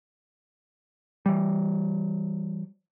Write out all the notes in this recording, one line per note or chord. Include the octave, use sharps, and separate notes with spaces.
E3 G3